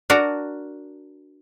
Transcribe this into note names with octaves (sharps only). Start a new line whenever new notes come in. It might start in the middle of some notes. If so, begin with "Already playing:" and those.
D4 F#4 A#4